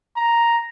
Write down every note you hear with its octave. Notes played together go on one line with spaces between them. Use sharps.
A#5